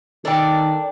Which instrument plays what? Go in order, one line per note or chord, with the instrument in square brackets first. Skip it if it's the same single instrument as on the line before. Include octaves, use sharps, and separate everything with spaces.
[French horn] D#3 [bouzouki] D4 D5 [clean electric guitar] A4 A#4 G5